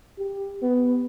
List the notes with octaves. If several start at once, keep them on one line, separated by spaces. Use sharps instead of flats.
G4
B3